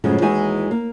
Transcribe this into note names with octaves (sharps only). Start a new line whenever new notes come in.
F#2 A2 C#3 F3 G#3 C#4
D#2 E3 G#3 D#4 F#4 G#5
A#3